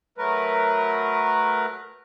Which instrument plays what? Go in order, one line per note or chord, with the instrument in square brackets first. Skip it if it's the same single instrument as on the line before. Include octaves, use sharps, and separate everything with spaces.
[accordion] F#3 A3 A#4 B4